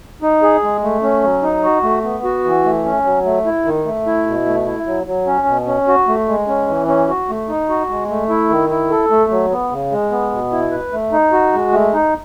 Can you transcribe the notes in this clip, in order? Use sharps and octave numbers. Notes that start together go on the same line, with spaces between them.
D#4
G#4
G#3
A3
C#4
F#3
D#4
F#4
A3
B3
F#4
E3
A3
C#4
F#3
A3
E4
D#3
A3
E4
B2
A3
E4
F#3
F#3
C#4
B2
C#4
F#4
A3
G#3
C#4
E3
C#4
F#4
A3
D#4
F#4
G#3
A3
E4
D#3
E4
A4
A3
F#3
B3
C#3
G#3
B3
B2
E4
B4
A3
D#4
F#4
G#3
A3
D#4